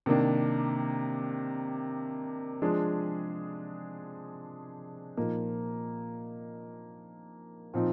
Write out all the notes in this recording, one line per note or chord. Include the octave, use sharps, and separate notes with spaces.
C3 D#3 A#3 D4
F3 G#3 D4 G#4
A#2 F3 A#3 D#4
A#2 F3 C4 D#4